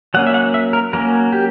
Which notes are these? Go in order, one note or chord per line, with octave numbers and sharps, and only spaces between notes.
F#3 A#3 C#4 F#5
E5
F#5
E5
A#4
F#3 A#3 C#4 A#4
G4